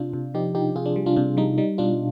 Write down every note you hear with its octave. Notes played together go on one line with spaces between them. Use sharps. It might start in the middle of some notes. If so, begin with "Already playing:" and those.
Already playing: C3 D4 F4
C3
F3 D#4 G4
F3 D#4 G4
C3 F4 G#4
D4
G3
D4 F4
C3 D4
G3 D#4
G3 D#4
B2 D4 F4